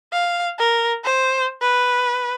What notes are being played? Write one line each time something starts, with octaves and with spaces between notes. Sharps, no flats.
F5
A#4
C5
B4